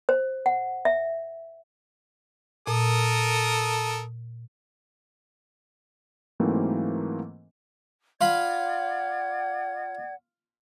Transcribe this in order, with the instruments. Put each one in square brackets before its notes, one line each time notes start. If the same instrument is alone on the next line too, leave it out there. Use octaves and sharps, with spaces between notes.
[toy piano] C5
F#5
E5
[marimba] A#2 [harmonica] A4 A#4 D#6
[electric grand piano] G#2 E3 F#3 A3 A#3 C4
[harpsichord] F4 F5 B5 [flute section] D5 F#5 G#6